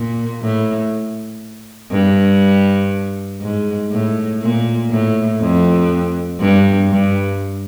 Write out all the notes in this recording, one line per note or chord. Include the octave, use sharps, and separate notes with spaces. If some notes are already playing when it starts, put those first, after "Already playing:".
Already playing: A#2
A2
G2
G#2
A2
A#2
A2
F2
G2
G2